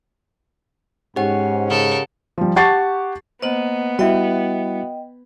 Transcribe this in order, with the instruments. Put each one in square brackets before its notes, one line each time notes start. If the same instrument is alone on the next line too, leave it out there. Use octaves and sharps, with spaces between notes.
[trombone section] G#2 [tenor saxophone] C#4 [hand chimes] G4 F#5
[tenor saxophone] C#3 [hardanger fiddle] A4 A#4
[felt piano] F3 G3
G4 F#5 A5 C#6 A6 C7
[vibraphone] A#3 D#5 [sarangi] B3 [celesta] C5 F#7
[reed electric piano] G3 E4 [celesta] F#4 E5 [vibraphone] D#5 G5